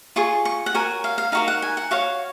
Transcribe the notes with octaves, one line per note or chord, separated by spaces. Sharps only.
F4 G#4 C#6
C#6
F#5
F#4 A#4 C#5 G#5
F5
F5
D#4 F#4 A#4 F5
F#5
G#5
F#5
F#4 C#5 F5